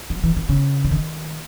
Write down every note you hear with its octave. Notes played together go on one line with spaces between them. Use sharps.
F#3
E3
D#3
C#3
E3
D#3